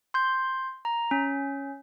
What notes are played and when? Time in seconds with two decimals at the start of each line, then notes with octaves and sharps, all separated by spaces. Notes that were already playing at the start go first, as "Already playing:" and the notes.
0.14 C6 G6
0.85 A#5
1.11 C#4